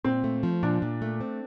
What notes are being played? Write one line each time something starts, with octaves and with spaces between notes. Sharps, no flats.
A#2 C4
A3
F3
A#2 D4
A#2
A3
C4